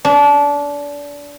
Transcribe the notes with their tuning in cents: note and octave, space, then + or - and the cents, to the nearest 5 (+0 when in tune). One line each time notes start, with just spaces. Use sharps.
D4 -25